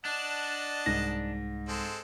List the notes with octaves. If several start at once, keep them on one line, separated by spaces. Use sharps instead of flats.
D4 D#5 F#5 A5
C2 G#2 A#6
G#3 C4 A4